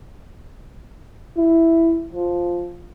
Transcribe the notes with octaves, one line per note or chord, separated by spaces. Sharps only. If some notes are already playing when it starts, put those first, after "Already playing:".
E4
F3